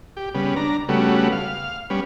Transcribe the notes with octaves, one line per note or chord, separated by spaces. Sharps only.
G4
C#3 G3 B3
D4 A#5
C#3 G3 A3 B3 F#4
F5
G3 B3 C#4